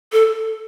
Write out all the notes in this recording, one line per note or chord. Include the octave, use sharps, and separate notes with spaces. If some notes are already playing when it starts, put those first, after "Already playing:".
A4